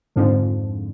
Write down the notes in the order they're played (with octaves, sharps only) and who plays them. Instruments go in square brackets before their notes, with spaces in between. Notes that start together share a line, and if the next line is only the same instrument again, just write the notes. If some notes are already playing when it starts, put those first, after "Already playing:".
[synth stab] F2 G#2 D3 F3